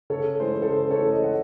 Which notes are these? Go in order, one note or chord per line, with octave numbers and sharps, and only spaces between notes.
C#3 A4 C#5
E3 G#3 C#4 E4 C5
A4
C#3 C5
A4 C#5
E3 G#3 C#4 E4
C5 D#5
F#5